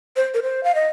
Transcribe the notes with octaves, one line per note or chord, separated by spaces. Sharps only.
C5
A#4
C5
F5
D#5